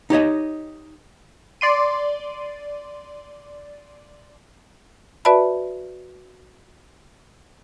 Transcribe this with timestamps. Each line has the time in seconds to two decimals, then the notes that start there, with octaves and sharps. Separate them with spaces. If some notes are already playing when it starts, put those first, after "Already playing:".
0.10 D#4 G4 C#5 D#5
1.61 D5 C6 D#7
5.25 F#4 B4 D5 E5 A5 B5